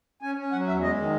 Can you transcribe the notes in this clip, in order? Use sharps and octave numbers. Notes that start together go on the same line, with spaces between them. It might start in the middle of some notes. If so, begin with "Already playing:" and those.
C#4 G#5
C#4
F#3 F#5
E2 E5
G#3 D#5
D#3